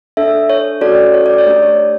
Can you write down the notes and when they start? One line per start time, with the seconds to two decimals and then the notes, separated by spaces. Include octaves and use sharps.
0.17 D4 A4 E5
0.50 C#5
0.81 C#4 F#4 A4 D5
1.14 C#5
1.26 D5
1.38 C#5
1.46 A3 D4 G4 D5
1.62 C#5